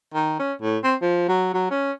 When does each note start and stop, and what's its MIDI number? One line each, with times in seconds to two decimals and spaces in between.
0.14 0.35 51
0.39 0.53 61
0.62 0.78 45
0.84 0.95 60
1.02 1.27 53
1.29 1.50 54
1.54 1.68 54
1.71 1.92 61